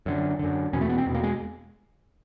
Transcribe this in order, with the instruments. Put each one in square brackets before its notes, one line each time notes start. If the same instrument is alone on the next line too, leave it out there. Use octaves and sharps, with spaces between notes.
[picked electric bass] F#2 D3
F#2 D3
E2 B2 C#4
A3
B3
C4
E2 B2
A#3
G#3